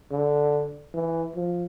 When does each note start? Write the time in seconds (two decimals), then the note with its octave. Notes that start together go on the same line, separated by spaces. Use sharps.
0.12 D3
0.94 E3
1.36 F3